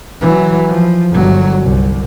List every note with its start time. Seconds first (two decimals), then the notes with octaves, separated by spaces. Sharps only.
0.21 E3 F#3
0.68 F3
1.11 G1 F#3
1.64 C2